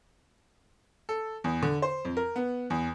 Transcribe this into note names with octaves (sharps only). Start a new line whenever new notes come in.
A4
E2
D3
C5
F2
A#4
B3
E2